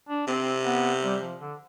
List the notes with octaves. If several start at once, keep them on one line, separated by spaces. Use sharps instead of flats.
D4
C3 C4
B3
G3
F3
D3